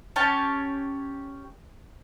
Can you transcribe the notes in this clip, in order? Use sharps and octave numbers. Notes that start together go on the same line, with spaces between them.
C#4 G4 C#5 A5